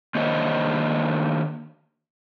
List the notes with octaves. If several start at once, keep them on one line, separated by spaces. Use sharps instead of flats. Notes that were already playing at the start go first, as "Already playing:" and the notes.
D#3 A#3 D4 C5 C#5 D#5